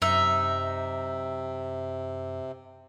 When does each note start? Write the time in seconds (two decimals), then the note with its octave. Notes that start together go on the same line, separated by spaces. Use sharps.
0.02 F#2 C3 D#4 E5